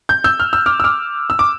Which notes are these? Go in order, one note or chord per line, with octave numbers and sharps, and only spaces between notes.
G6
E6 G6
F6
E6
D6 F6
E6
D6 F6
E6
D6